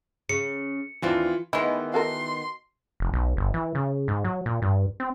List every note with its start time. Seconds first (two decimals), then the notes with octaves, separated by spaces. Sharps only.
0.29 C#3 C#7
1.02 D#2 E3 C4 D4 F4
1.53 D#3 E3 G#3 B3
1.94 F#4 A4 A#4 C6
3.00 F1
3.14 B1
3.37 G1
3.54 E3
3.75 C#3
4.08 G#2
4.24 F#3
4.46 A#2
4.62 G2
5.00 C4